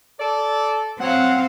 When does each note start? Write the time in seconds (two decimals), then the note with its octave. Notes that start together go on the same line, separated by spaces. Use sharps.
0.20 A4 D5
1.00 F#3 C4 F5 F#5